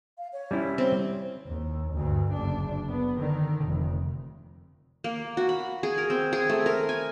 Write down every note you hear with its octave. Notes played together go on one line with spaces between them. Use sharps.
F5
C#5
G3 C#4 E4
C4
D#2
D2 G2
F#1 D4
B3
D3 D#3
F1
A#3
F#4
B5
G#4
A#4
C4
G#4
A3
A#4
G#5